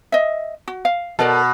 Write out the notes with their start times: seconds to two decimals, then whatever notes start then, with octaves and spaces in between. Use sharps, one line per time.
0.12 D#5 E5
0.68 F#4
0.85 F5
1.19 B2 A4 A#4 D5